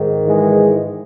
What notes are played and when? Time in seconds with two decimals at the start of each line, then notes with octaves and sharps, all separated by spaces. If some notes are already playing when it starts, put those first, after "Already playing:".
Already playing: G#2 D#3
0.26 E3 G#3